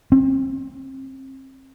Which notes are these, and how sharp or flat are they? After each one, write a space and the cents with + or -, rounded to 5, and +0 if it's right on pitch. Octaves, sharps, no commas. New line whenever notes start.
C4 +35